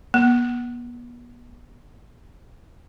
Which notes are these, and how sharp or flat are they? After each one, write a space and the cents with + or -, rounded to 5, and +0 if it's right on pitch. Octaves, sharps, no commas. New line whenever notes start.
B3 -35